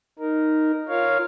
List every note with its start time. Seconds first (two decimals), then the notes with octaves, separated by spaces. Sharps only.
0.19 D#4 A#4
0.89 F4 A#4 C#5 F5